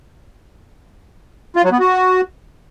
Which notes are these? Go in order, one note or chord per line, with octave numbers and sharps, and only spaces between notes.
F4
F#3
B3
F#4